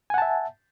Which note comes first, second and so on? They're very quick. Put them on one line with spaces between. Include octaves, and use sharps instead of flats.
G#5 F#5 A5 E5